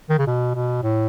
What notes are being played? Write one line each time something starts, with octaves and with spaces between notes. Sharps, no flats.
D#3
C#3
B2
B2
A2